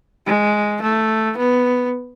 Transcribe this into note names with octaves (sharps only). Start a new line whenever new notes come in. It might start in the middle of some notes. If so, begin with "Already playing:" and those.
G#3
A3
B3